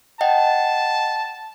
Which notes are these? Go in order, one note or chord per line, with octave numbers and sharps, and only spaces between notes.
D#5 F#5 G5 A5